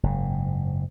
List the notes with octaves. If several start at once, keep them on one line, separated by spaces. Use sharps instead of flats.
F#1 G#2